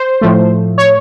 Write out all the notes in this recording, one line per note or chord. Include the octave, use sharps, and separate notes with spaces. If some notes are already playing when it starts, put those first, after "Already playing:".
Already playing: C5
A2 F3 A3
C#5